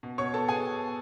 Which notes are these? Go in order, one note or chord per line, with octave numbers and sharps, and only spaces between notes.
B2
B2 C#5 C#6
B3 A4 A5
B2 G#4 G#5